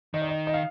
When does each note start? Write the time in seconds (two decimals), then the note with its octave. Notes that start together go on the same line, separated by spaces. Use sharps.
0.14 D#3 D#5
0.22 D5
0.29 D#5
0.47 D#5
0.54 F5